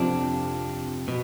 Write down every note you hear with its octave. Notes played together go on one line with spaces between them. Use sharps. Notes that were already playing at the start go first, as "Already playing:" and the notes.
Already playing: F2 C3 F3 D4
B2